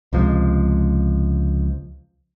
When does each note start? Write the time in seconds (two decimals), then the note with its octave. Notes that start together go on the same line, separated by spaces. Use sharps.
0.13 C#2 C3 F3 G#3